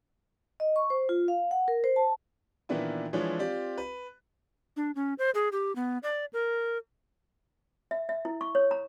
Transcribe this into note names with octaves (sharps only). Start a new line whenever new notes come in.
D#5
C#6
C5
F4
F5
F#5
A#4
C5
A5
A#2 D#3 E3 B3 D4 E4
E3 F3 G#3 D4 E4 C#5
C4 F4 G4 D5
B4
D4
C#4
C5
G#4
G4
B3
D5
A#4
E5
E5
E4
C#6
C#5
A#5